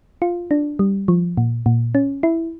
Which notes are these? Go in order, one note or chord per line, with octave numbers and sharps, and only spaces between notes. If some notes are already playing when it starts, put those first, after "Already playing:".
F4
D4
G3
F3
A#2
A#2
C#4
E4